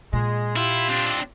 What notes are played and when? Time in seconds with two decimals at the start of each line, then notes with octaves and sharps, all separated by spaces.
0.13 A#2 G#3
0.56 E4 F4 G4 F5
0.89 C4 D4